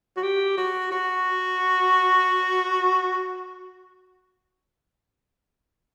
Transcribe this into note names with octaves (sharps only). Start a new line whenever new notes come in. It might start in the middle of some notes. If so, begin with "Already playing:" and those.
F#4
G4
F#4
F#4